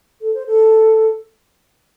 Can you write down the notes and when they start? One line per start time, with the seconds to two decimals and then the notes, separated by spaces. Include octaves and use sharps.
0.21 A4
0.34 C5
0.47 A4